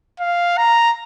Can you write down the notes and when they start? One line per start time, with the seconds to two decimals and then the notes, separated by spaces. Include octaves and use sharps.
0.20 F5
0.58 A#5